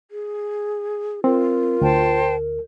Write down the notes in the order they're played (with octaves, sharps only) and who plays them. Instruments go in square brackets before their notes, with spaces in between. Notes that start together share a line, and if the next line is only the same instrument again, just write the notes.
[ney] G#4
[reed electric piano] C4 [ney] F4 [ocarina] A#4
[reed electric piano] D2 [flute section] C5 G5 A5